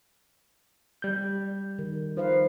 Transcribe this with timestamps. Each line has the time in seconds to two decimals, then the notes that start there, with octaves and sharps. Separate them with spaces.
1.02 G3 G6
1.79 D#3
2.17 F3 D#4 B4 F5